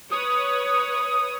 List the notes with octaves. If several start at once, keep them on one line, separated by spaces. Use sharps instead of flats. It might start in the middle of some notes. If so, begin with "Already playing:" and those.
B4 C#5 D#6